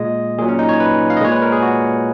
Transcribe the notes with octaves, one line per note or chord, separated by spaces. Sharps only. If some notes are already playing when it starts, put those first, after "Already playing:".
Already playing: A#2 G#3 D#5
A#2 F#3 G#4
C#4
D#4
C#5
B4
F5
D#5
A#2 G#3 C#5
B4
A#4
G#4
F#4